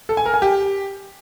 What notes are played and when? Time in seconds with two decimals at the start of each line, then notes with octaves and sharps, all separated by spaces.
0.09 A4
0.17 G#5
0.25 A#4
0.34 G#5
0.42 G4